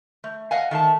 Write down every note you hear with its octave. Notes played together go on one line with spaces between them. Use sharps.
A3
D#5 F5 F#5 G#5
D#3 A3 F5 A5